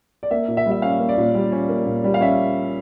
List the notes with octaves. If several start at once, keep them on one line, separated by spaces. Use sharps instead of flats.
D5
A#3 E5
A#2
E5
G3
E5
C#4 F5
A#3
D5
A#2
G3
C#4
A#3
A#2
G3
F5
C#4 E5